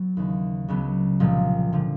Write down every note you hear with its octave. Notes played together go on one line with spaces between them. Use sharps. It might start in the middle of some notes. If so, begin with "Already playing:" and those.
Already playing: F#3 B3
D#2 C#3 E3
C#2 C#3 F#3 B3
C2 A#2 F3 G#3
D3 F3